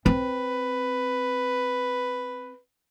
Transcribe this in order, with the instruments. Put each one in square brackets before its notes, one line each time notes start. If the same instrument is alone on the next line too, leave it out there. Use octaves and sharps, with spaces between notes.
[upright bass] C4 [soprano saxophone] B4